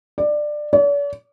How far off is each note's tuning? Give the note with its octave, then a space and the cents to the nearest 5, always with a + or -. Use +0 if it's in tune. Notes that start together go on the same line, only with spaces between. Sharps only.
D5 +20
D5 -45